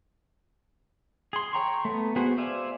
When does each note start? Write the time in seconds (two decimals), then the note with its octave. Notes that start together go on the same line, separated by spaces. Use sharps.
1.33 G#4 C6
1.53 C#5 G5 A#5 C6 C#6
1.85 A3 B3
2.16 B3 F#4 G#4 C5
2.38 C5 D5 E5 F5 G#5